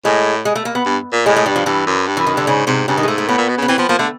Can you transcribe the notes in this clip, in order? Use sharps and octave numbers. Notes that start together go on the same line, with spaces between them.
A2 G#3
G#3
A3
A#3
B3
G2
A#2
A2 G#3
G#3
G2 G3
F3
G2 E3
F#2
G2
E3
F#2
D#3
G2 D3
G#2 C#3
G#2 C3
G2 C#3
D#3
G#3
G#2 A3
A3
A2 B3
A#2
B2
C#3
B3
E3 C4
F3 B3
F3 A#3
D3 A3